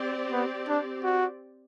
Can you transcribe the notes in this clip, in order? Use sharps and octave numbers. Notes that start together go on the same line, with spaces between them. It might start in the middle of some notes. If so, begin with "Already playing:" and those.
Already playing: C4 G4 D5
B3
D4
F#4